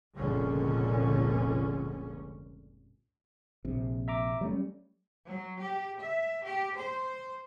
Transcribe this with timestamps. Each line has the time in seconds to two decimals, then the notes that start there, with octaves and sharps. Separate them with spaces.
0.17 F1 C#2 A#2 D3 C#4
3.65 A#1 C3
4.08 E5 A#5 D6
4.41 F#3 G3 A3 C#4
5.26 F#3
5.60 G4
6.00 E5
6.44 G4
6.77 C5